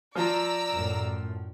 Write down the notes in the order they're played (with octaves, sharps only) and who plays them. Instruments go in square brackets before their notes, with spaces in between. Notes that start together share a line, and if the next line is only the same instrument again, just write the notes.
[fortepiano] F3 [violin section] D5 A#5 E6
[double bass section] F#2 A2